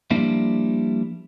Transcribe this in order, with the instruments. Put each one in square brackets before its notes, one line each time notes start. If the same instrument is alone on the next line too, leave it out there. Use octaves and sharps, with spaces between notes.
[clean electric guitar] F3 G3 A#3 D4 E4